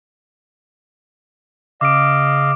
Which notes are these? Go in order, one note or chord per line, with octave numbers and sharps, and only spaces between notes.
C#3 D#5 F5 D6 D7